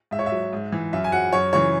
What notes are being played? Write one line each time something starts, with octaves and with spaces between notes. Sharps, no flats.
G#2 E5
C#5
E5
F#3
G#2
E3
F#2 E5
G#5
F#3 F#5
F#2 C#5
C#3 E3 C#5